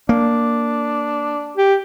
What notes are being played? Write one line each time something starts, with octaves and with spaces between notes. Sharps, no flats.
A#3 D4
G4